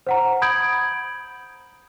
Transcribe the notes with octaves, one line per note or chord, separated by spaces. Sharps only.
C5 F#5 A#5
B5 D#6 G6 G#6 D7 F#7